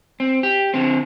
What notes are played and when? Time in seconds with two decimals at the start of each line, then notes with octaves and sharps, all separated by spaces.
0.20 C4
0.43 G4
0.74 D3 C4